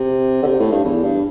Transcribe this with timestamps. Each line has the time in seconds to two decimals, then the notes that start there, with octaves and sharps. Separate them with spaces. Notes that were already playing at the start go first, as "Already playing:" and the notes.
Already playing: C3
0.43 D3
0.47 C3
0.60 A2
0.72 G2
0.84 E2
1.03 G2